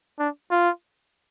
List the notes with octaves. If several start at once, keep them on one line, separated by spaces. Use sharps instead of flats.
D4
F4